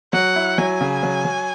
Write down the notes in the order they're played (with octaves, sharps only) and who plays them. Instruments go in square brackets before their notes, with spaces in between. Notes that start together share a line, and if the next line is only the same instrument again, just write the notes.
[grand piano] F#3 [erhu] F#5
[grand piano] E4
[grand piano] F#3 [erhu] G#5
[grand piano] C#3
F#3
F#3